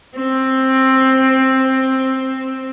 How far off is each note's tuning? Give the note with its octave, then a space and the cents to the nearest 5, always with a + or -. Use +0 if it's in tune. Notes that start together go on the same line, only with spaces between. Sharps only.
C4 +10